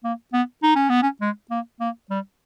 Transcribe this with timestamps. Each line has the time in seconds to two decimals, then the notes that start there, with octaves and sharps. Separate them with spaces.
0.04 A#3
0.33 B3
0.63 D#4
0.76 C#4
0.90 B3
1.03 C#4
1.21 G#3
1.51 A#3
1.81 A#3
2.10 G3